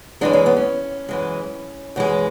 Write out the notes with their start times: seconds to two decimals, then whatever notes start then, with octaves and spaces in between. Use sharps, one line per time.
0.21 F#2 E3 G#3 D4
0.33 C#4
0.46 B3
0.57 C#4
1.09 F#2 E3 G#3
1.96 F#2 E3 G#3